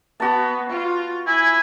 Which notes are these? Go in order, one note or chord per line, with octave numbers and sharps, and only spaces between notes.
B3 F#4 A5
F4
E4 G#5